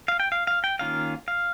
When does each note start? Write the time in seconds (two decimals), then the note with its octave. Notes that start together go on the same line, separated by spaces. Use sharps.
0.08 F5
0.20 G5
0.32 F5
0.47 F5
0.64 G5
0.79 D#3 A#3 C#4 F4 F5
1.28 F5